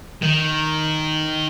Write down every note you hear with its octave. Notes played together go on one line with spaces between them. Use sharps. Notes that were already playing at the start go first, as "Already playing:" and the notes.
D#3